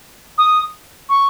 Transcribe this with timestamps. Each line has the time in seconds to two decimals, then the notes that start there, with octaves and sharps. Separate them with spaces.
0.38 D#6
1.09 C#6